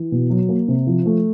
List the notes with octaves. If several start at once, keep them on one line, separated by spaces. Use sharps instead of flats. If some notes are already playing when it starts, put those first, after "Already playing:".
Already playing: E3
B2
F#3
A#3
C3
F3
A3